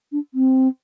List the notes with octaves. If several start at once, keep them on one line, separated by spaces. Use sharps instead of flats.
D4
C4